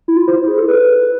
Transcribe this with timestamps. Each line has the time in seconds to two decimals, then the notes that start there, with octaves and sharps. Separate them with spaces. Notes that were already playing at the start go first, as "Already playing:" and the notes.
0.08 E4
0.17 F4
0.28 C5
0.38 E4
0.48 G#4
0.58 A4
0.68 B4